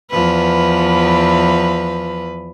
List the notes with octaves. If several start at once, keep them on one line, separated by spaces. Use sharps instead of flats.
E2 F3 B4